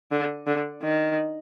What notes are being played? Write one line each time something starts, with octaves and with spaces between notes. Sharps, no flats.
D3
D3
D#3